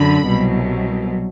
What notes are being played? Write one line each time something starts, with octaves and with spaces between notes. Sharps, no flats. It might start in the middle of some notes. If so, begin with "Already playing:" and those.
Already playing: F#2 D3 B5
C2 B2 F#3